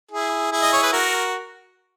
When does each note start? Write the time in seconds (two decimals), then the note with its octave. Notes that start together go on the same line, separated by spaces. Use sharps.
0.11 E4 G#4
0.52 E4 G#4
0.62 D#5
0.73 C#5
0.83 B4
0.93 F#4 A#4